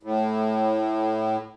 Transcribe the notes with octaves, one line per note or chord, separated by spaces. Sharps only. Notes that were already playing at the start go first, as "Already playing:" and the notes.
A2